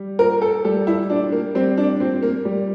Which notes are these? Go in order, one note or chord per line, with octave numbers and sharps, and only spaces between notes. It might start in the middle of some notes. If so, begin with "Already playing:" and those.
Already playing: G3
A#2 A#4
A4
G3 A4
E4
A#2 D4
A#3
G3 C4
D4
A#2 C4
A#3
G3